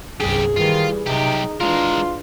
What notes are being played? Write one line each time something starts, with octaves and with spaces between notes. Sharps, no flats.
G1 C2 F#2 G4 G#4
D#3 E3 G3 F4
B1 C3 D#4 G4
E3 G#3 D4 F4 A#4